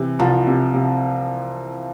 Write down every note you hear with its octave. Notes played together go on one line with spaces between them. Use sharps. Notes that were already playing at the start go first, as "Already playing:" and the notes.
Already playing: C3 E3
C2 F3
C3
C3